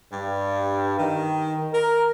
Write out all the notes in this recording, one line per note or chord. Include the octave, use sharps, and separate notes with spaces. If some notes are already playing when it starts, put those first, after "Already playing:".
G2
D#3
A#4